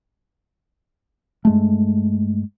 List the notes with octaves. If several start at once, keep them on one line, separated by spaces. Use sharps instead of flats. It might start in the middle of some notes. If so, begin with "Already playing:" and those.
G2 G#3 A3